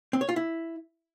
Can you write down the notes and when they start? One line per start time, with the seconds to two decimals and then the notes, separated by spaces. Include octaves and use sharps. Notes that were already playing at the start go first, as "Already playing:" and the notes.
0.13 C4
0.21 C#5
0.29 F4
0.36 E4